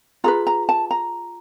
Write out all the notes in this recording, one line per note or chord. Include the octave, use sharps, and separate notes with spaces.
F4 G#4 B4 A#5
A#5
A5
A#5